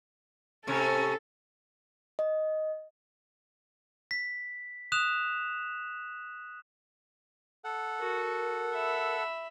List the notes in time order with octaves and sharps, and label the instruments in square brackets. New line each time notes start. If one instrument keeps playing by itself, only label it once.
[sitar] A2 C3 C#4 [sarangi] A4
[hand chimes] D#5
[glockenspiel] B6
D#6 F#6 E7 F7
[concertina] A4 F#5
[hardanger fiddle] F#4 [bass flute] A#4
[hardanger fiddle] E5 B5